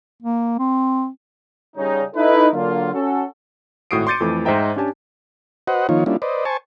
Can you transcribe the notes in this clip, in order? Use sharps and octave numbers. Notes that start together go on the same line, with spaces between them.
A#3
C4
C#3 G3 C#4 D#4
D#4 E4 A4 B4
D3 F#3 A#3 F4
C#4 F#4 A4
G#1 A2 F#4 D#6 C7 D7
C6 D6 G6 A6 C#7 D#7
F2 E3 A3 D6
G#2 C5 D#5 E5 G5 A#5
C#4 D4 G4 G#5 A5
F#4 B4 C5 D#5 F#5
D#3 F3 A#3 D#4 F4 C#5
G3 A#3 C#4 D4 E4 F4
B4 C5 D5 D#5
C5 G#5 A5 C#6